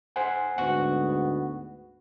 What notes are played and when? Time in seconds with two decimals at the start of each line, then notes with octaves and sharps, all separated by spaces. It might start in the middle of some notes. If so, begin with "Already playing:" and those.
0.16 C5 F#5 G#5
0.58 D2 G#2 B3 F#5 C#6